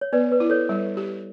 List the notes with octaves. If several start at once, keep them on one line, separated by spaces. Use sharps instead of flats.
C#5
B3 B4 D5
B4
E4
A4 C#5
G3
G4